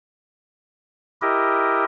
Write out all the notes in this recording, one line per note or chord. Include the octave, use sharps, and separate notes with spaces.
E4 G4 A#4 D#5